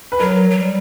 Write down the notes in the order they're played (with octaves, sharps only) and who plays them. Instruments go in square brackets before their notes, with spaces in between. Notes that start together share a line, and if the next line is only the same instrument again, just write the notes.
[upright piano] B4
[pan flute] F#3 [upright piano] A#4
[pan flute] F#3
G3